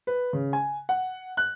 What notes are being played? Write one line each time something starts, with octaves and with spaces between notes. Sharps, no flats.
B4
C#3
G#5
F#5
F#6